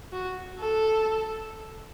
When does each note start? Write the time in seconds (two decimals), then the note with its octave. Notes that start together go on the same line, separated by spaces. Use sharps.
0.13 F#4
0.59 A4